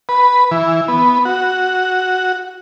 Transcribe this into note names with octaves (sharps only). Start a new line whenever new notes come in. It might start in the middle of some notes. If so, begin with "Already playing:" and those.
B4
E3
B3
F#4